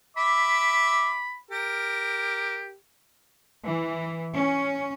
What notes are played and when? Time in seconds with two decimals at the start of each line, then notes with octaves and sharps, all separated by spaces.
0.17 E5 B5 D6
1.50 G4 A#4
3.62 E3
4.34 C#4